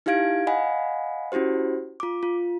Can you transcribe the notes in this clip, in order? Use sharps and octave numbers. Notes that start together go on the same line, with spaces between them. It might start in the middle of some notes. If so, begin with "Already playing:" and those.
D#4 E4 G4 F5 G#6 D7
D#5 F5 F#5 G#5 B5
C#4 E4 F#4 G4 C5
F4 D6
F4